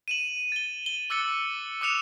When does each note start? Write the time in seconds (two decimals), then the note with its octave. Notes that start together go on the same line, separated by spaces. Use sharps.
0.08 D#7 E7 F#7
0.52 A6 G7
0.86 G7
1.10 D6 E6 F#6 A6 C#7 G7
1.81 D6 D#6 F#6 C#7 E7 F7